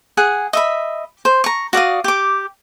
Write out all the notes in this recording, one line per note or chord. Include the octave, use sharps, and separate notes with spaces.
G#4 F#5 G#5
D#5 E5 B5
C5
A#5 C#6
F#4 D5 F5 D#6
G4 D6